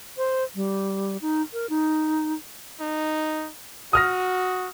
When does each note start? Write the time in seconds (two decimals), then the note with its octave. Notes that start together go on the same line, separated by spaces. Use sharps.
0.18 C5
0.55 G3
1.22 D#4
1.53 A#4
1.70 D#4
2.81 D#4
3.93 F#4 D#6 F6 A#6